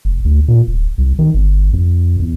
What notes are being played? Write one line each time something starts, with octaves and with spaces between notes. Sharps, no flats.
F1
D2
A#2
D1
C2
D#3
G1
F2
E2